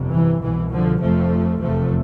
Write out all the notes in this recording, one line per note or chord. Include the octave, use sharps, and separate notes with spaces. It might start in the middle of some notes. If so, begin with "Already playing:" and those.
Already playing: G1 F2 C3
E3
C2 B2 E3
D3 F3
F1 F2 C3 F3 A3
F1 E2 C3 F3 A3